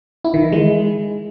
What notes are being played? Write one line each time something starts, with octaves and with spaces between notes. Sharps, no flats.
E4
D#3
E3
G#3